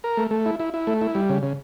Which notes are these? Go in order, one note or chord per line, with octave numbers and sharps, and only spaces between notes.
A#4
A3
A3
E4
E4
E4
A3
E4
G3
C#3
C#3